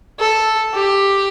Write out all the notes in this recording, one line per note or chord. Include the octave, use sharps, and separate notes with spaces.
A4
G4